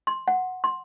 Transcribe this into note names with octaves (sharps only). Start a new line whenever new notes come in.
C6
F#5
C6